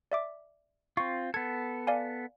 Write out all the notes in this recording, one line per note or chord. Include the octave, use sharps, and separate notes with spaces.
D5 E5 D6
C4 F4 C#6
B3 A4 G#6
D5 F5 G#5